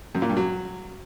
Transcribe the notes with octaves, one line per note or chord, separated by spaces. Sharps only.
F#2
A#2
G2
F#3